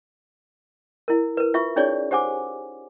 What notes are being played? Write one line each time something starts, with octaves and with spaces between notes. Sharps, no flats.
E4 A#4
A#4 B4
F4 E5 C#6
C#4 D#4 G#4 C#5 D5
G4 C5 F#5 G#5 D6